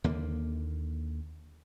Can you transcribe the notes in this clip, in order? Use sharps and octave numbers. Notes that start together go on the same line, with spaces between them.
D#2 D3 A#3